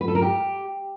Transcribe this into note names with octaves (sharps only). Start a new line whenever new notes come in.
B4
A4
A#4
G4